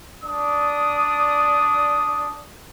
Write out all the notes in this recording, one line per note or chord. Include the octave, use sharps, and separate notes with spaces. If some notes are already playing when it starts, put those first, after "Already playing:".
D4 D5 D#6